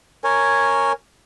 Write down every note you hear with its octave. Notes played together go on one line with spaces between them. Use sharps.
A#4 C#5 G#5